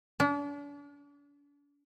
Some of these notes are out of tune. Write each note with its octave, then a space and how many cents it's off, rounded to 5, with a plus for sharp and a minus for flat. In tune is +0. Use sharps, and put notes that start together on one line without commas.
D4 -40